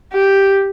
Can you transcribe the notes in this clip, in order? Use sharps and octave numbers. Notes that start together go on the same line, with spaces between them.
G4